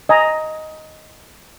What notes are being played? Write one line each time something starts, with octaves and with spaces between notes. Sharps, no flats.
D#5 G#5 A#5